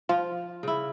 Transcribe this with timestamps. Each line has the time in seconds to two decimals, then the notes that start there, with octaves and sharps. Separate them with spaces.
0.09 F3 F4
0.63 C#3 E4